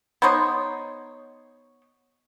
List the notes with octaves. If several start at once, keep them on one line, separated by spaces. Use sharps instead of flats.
B3 D#4 C5 C#5